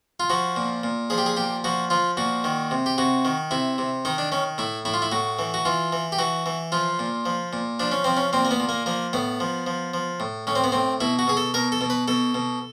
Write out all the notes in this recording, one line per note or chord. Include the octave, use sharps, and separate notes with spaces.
F4
F3 F#4
A#2
A#2
F3 G#4
G4
G#4
A#2 G4
F3 F#4
F3 F4
A#2 F#4
D#3
C3
G4
C3 F#4
D#3
C3 E4
C3
D#3 D#4
D4
D#3 C#4
A2 E4
A2 E4
F4
E4
A2 F#4
E3
F#4
E3 F4
E3
G4
E3 F#4
E3
F3 F4
A#2
F3
A#2
F3 D4
C#4
F3 C4
C#4
A#2 C4
A#3
B3
A#2
A#3
F3 A#3
A2 B3
F3
F3
F3
A2
A2 C#4
C4
B3
A2 C4
B2 E4
F#4
B2 G#4
A4
B2 A#4
A4
B2
B4
B2 A4
B2